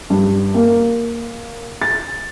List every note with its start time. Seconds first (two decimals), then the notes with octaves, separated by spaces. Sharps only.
0.10 G2
0.54 A#3
1.82 A6